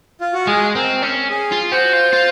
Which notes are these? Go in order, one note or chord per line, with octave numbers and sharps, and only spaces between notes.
F4
F#4
G#3 G#4
C4 A#4
C#4
G#4
F4
F#4 C5
F4
F4